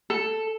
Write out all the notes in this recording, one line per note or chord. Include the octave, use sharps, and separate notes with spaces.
A4